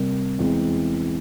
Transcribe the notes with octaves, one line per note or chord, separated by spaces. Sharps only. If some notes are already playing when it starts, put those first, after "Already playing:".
Already playing: C3 G3 A#3
E2 E3 G#3 C4